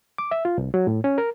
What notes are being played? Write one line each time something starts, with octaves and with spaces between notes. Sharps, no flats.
D6
E5
F4
C2
F#3
A2
C#4
A#4